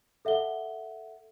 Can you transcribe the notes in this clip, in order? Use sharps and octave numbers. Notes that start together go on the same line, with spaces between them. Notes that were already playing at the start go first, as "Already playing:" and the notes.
A4 E5 F#5 G7